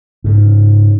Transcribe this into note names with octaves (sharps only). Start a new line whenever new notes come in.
G#2 C#3